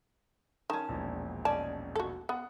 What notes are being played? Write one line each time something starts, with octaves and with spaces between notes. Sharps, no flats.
D#3 C#4 A5
E1 A#1
C#4 D#4 D5 A5
F#4 A4
B3 F#5